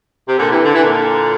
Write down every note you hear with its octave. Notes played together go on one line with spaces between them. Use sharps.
C3
A#2 D3
C3 E3
D3
E3
A#2 D3